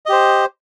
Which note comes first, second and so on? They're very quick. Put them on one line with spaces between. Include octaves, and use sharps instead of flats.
D#5 G4 C5